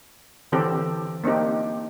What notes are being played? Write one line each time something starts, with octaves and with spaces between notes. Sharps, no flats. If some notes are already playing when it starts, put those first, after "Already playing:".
D3 E3 C4 G4 A4
A#3 C4 D4 D#4 G4